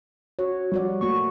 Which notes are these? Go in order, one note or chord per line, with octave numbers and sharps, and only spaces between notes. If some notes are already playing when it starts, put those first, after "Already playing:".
F#4 C#5
F3 G3 F#4 D5
A3 A#3 F#4 C#6